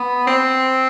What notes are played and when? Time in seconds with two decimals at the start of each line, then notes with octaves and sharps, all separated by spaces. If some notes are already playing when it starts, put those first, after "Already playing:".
Already playing: B3
0.27 C4